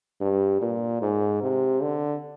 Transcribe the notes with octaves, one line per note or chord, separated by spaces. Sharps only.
G2
A#2
G#2
C3
D3